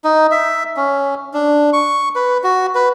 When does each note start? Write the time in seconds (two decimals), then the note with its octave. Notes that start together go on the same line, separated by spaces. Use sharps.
0.04 D#4
0.31 E5
0.77 C#4
1.34 D4
1.73 C#6
2.16 B4
2.44 F#4
2.75 B4